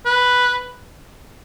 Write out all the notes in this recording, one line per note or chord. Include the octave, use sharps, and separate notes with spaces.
B4